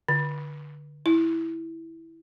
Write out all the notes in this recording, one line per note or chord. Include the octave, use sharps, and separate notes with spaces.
D3
E4